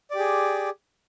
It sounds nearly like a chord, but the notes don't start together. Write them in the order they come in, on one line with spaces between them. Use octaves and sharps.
D5 G4 G#4